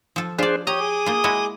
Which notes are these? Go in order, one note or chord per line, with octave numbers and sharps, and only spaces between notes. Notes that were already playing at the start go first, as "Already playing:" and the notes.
F3 A4
D4 F4 G#4 C5 D5
G4 C#5 A#5 D#6
G#4 D6
A#3 F4
G#3 E4 F#4